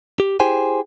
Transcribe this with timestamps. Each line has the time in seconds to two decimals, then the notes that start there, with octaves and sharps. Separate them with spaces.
0.20 G4
0.40 E4 G4 G#4 C5 G5 G#5